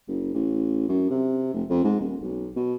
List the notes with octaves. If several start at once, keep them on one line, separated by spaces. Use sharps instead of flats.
F#1
A1
F#2
C3
F1
F2
G#2
D#1
B1
B2